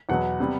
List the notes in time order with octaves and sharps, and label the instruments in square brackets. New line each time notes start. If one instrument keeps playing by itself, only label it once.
[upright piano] E2 B2 F#3 B3 F#5
C3 G3 B3